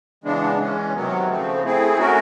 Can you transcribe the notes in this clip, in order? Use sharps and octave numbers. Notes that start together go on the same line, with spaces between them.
C#3 E3 G#3 B3 D4
E3 G#3 C#4
C3 D#3 F#3 B3
C#3 F3 A3 C4
A3 C4 E4 G#4
A3 C#4 F#4 A#4